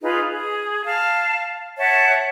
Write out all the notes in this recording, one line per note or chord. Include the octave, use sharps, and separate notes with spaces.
D#4 F4 G#4 B4
G#4
F5 A5
C#5 E5 F#5 A5